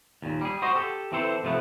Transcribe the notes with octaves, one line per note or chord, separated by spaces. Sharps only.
D#2 A#2
G3 G#4
F#4 C5 D#5
G4 A4
E3 C4 A4 C5
C3 F3 A3 B3